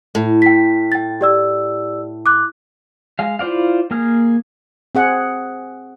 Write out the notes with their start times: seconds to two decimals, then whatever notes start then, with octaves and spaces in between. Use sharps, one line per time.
0.15 A2
0.42 G5 B6
0.92 G5 A6
1.21 G4 D5 E6
2.26 D6 F#6
3.19 G#3 F5
3.39 E4 F4 C5 D5 F5
3.91 A#3 G#4 F6
4.95 C4 G#4 F#5